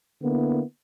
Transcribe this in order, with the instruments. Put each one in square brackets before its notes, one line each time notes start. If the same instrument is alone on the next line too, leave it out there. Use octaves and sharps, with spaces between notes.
[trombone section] D3 A#3 B3 E4